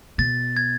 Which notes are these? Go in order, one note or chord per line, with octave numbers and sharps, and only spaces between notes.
B2 A6
G#6